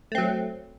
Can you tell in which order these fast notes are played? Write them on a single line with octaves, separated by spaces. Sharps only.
A3 C4 F#3